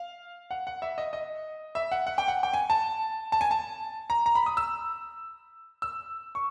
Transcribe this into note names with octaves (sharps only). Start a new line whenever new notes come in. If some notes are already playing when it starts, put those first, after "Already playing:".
Already playing: F5
F#5
F#5
E5
D#5
D#5
E5
F#5
F#5
G5
F#5
G5
G#5
A5
A5
G#5
A5
A#5
A#5
B5
D#6
E6
E6
C#6